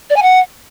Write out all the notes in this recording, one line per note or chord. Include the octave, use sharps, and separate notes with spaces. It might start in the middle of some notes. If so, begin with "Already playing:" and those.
D5
G#5
F#5